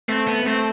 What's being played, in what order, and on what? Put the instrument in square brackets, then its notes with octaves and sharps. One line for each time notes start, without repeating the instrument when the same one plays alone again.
[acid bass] A3 [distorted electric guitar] C4
[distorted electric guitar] B3
[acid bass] A3 [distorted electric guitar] C4